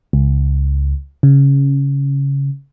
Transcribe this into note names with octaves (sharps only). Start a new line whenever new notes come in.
C#2
C#3